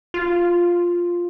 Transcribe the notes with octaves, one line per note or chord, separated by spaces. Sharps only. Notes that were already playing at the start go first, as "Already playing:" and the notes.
F4